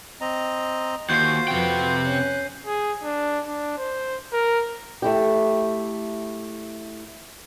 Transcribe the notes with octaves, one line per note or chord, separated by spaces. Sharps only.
C4 D#5 A#5
D#2 F4 F#4 C5 G6 C7
F2 C3 B4 G5
C#4 F#6
G#4
D4
D4
C5
A#4
A3 E4 G4